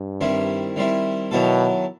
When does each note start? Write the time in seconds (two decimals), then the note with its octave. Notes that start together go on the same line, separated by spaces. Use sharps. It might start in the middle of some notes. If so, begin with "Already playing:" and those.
Already playing: G2
0.21 D#3 G3 C4 E4
0.76 D#3 G3 C4 E4
1.31 B2 D#3 F#3 B3 E4 A4